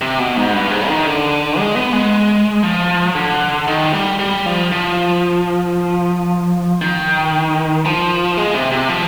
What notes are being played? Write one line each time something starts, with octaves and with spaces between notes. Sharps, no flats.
C3
B2
G#2
G2
G#2
D#3
D3
G#3
B3
G#3
F3
D3
D#3
G3
G3
F3
F3
D#3
F3
G#3
C3
C3
F3